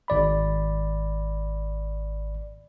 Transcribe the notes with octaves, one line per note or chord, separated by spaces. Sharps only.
G#1 D5 B5